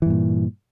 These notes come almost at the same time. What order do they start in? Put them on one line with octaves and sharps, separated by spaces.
E3 G2 A#2